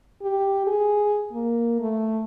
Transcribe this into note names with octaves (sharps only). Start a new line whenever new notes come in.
G4
G#4
A#3
A3